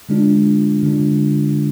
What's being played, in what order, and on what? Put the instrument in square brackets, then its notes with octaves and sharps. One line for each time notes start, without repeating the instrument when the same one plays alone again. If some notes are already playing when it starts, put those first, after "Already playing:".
[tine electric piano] D3 G#3 D4 F4
D3 G#3 D4 F4